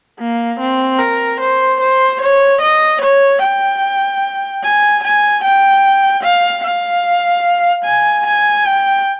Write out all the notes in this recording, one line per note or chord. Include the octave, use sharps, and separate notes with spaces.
A#3
C4
A#4
C5
C5
C#5
D#5
C#5
G5
G#5
G#5
G5
F5
F5
G#5
G#5
G5